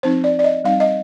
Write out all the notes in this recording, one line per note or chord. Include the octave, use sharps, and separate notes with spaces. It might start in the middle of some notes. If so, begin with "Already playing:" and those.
F3 C4 D#4 C5
D5
D5
D#5
G3 C4 D#4 F5
D#5